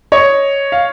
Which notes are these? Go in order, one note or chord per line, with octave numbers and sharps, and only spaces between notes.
C#5 D#5
F5